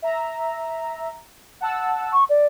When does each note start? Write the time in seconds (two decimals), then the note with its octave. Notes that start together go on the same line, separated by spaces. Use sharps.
0.02 E5 A#5
1.61 F#5 A5 E6
2.12 C#6
2.29 D5